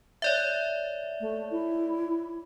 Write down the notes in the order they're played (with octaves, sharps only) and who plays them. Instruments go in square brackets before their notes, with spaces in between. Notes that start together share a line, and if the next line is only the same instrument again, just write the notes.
[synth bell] C#5 D5 E5
[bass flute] A3
E4